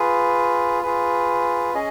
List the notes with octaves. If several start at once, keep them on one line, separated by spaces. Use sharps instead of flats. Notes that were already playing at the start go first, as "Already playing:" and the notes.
Already playing: F4 G#4 B4
F4 G#4 B4
C#4 G#4 D#5